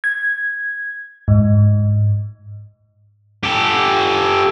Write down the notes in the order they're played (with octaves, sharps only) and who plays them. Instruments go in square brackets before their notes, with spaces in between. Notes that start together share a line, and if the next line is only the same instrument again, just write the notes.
[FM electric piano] G#6
G#2
[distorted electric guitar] G4 A4